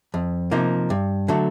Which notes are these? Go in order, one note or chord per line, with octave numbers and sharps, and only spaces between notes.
F2
C3 F3 A#3 D#4
G2
D3 F#3 A3